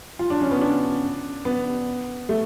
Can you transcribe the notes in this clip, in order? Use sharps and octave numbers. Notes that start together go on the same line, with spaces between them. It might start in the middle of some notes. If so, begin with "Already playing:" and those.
F4
D4
C#4
B3
D4
B3
A3